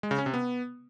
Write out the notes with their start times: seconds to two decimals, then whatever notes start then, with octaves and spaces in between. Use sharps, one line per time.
0.03 G#3
0.11 C#3
0.18 C#4
0.26 C3
0.34 B3